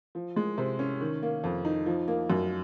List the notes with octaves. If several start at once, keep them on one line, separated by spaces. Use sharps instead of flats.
F3
G#3
C3
C#4
D#3
A#3
F2
D#4
F3
A#3
F#2